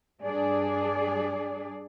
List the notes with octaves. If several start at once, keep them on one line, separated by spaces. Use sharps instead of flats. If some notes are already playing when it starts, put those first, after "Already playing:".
G2 D4 G#4 D5